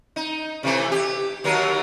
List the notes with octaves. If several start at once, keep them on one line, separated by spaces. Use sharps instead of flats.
D#4
C3 E3 A3
G4
D#2 F#3 A#4